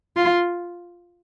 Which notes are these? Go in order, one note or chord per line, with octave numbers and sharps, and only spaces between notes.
F4